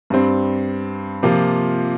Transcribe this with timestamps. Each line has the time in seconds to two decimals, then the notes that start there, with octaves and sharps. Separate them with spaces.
0.10 G2 G3 C4
1.23 C3 F3 A#3 F4